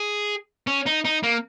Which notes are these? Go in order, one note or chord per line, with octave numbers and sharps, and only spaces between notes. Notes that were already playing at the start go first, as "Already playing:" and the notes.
Already playing: G#4
C#4
D#4
D#4
A#3